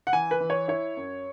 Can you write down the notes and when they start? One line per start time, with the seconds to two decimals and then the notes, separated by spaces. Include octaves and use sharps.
0.07 F#5
0.13 E3 G#5
0.31 B4
0.40 E3
0.50 C#5
0.68 E4 C#5
0.97 F#2